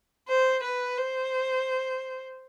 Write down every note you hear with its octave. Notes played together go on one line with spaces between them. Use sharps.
C5
B4
C5